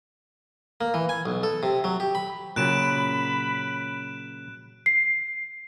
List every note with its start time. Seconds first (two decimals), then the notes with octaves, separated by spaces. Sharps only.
0.81 A#3
0.94 E3
1.09 G#5
1.26 B1
1.43 A4
1.63 C3
1.84 F#3
2.00 G4
2.15 B5
2.56 A#2 C#3 F#3 B5 F#6 D7 E7
4.86 C7